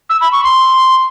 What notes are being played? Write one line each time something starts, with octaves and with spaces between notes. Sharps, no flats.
E6
B5
C#6
C6